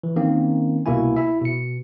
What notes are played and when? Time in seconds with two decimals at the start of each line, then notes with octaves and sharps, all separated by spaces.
0.03 E3
0.16 D#3 A#3 C4 C#4
0.86 C2 B2 A#3 E4 G#5
1.16 E4 E5
1.42 B2 C#7